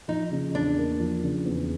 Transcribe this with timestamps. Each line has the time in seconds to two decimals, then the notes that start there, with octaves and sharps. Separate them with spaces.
0.08 F3 D#4
0.32 C#3
0.54 E2 D4
0.77 A#3
1.00 F3
1.23 C#3
1.45 E2